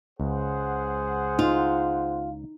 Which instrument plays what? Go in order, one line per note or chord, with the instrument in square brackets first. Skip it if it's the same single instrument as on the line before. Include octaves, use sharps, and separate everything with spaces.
[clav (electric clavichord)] C#2 [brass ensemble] G#4 C5 F#5
[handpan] D#4 [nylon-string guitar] F4